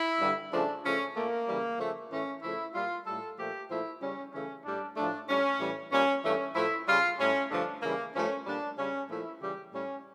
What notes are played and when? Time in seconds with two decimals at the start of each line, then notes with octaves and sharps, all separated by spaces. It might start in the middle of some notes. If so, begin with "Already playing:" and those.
Already playing: E4
0.20 G2 D3 G3
0.52 C#3 F3 A3 D4
0.84 C#3 F3 A3 C#4
1.16 A#2 A3 A#3
1.47 C#3 E3 G3
1.79 C#3 F3 A3
2.10 A2 E3 A3 C#4
2.42 C#3 F3 A3 E4
2.74 A#2 G3 F4
3.06 A2 G3 A4
3.38 A#2 F3 A3 G4
3.70 A#2 F3 A3 E4
4.01 C#3 G3 C#4
4.33 C#3 E3 A3 C#4
4.64 A2 G3 D4
4.96 A2 F3 A3 D4
5.28 A2 G3 C#4
5.59 A2 E3 G3
5.91 A#2 G3 C#4
6.23 G2 E3 A3 C#4
6.55 A2 F3 A3 E4
6.87 C#3 G3 F4
7.18 A2 G3 C#4
7.50 G2 D3 F3 A3 D4
7.82 C#3 E3 G3 A#3
8.13 G2 F3 A3 C#4
8.46 A#2 G3 D4
8.78 C#3 G3 C#4
9.09 A#2 F3 A3 E4
9.41 C#3 E3 G3 G4
9.72 A2 G3 C#4